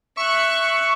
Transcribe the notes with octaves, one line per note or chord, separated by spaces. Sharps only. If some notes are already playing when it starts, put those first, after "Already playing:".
E5 C#6 F#6